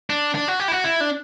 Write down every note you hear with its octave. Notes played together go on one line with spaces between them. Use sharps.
D4
D4
F#4
G4
E4
F#4
E4
D4